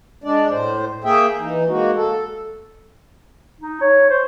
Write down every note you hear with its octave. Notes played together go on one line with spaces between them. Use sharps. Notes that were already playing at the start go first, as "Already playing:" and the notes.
G#3 D4 D5
A2 C5
A#3 G#4 E5 G5
E3 D#4
G#3 A#3 F#4
A4
D#4
C#5
C5